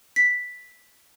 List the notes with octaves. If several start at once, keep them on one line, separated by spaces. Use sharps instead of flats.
B6